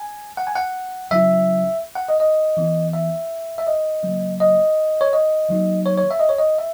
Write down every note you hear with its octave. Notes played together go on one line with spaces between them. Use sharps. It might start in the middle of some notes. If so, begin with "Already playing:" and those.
Already playing: G#5
F#5
G#5
F#5
C#3 F#3 C#4 E4 E5
F#5
D#5
D#5
E3 B3 E4
E5
E5
D#5
C#3 F#3 A#3
D#5
C#5
D#5
D#3 F#3 A#3 D#4
C#5
C#5
E5
D#5
C#5
D#5
E5